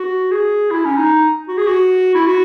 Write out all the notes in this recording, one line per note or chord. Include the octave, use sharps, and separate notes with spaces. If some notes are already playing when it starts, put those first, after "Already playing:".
Already playing: F#4
G#4
E4
C#4
D#4
F#4
G#4
F#4
E4
F#4